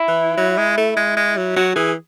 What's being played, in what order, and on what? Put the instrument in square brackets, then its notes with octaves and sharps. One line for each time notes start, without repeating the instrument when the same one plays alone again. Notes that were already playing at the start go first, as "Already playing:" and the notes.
Already playing: [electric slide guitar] E4
[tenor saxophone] E3
F#3
G#3
A3
G#3
G#3
F#3
[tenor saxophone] F#3 [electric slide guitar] F#4
[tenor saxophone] E3 [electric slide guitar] G#4